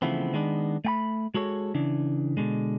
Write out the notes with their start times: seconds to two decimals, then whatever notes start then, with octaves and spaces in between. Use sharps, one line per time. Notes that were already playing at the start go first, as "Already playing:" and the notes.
0.02 C#3 E3 F3 A3 B3 C4
0.34 D#3 G#3 B3 D4
0.85 A3 G5 B5
1.34 G#3 F#4 A4 C#5
1.74 C#3 E3 D4
2.37 B2 D3 G#3